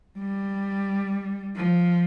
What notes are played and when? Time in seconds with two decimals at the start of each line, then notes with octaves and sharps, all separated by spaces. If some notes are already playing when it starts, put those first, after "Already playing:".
0.19 G3
1.56 F3